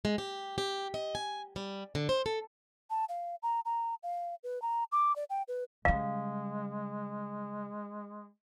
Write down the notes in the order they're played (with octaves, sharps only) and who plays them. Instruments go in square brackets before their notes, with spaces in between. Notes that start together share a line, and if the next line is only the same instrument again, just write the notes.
[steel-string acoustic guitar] G#3
G4
G4
D#5
G#5
G3
D3
C5
A4
[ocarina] A5
F5
A#5
A#5
F5
B4
A#5
D6
D5
G5
B4
[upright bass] C#3 G3 [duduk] G#3 [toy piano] F5